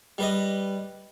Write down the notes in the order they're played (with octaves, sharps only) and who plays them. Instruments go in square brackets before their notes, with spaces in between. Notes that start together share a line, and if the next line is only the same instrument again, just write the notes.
[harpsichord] G3 B4 D#5